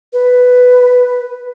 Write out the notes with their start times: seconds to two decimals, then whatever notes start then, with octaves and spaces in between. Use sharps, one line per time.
0.13 B4